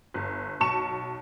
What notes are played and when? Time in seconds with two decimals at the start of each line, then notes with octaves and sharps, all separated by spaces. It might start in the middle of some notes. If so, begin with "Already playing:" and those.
0.14 G1
0.60 B1 A5 C#6 E7